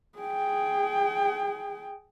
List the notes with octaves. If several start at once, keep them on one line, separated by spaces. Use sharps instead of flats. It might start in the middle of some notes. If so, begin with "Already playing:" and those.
G#4 G5